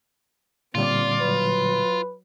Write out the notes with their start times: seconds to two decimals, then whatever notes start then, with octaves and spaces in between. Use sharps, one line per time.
0.75 A#2 D3 G3 C4 F4 D5
1.21 F#3 B4